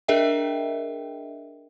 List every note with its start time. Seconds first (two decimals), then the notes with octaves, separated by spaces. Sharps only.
0.08 D4 G#4 A#4 D#5 E5 G5